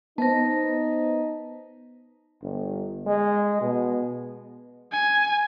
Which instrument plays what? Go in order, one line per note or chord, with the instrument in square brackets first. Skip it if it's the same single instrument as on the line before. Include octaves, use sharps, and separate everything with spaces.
[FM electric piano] B3 B4 C5 [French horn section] D#4 [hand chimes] A5 A#6
[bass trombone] G1
G#3
B2
[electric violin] G#5